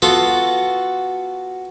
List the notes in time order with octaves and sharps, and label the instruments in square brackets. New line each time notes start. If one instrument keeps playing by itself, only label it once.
[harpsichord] B3 F4 A4 [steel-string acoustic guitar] F#4